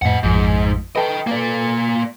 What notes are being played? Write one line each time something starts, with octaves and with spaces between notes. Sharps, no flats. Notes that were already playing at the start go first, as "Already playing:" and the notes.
F2 A2 D#5 F#5
A1 F2 G#2 F3
A4 B4 D#5 G5
A#3 D5